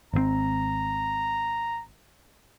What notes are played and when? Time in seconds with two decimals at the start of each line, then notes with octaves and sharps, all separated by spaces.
0.14 G#1 C#3 C4 A#5